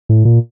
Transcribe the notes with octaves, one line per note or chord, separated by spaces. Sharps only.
A2
A#2